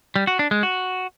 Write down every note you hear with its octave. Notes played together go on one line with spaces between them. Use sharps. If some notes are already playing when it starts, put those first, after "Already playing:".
G3
F#4
D4
G#3
F#4